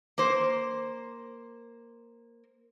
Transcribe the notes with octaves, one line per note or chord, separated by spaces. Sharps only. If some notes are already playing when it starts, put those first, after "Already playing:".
A#3 C5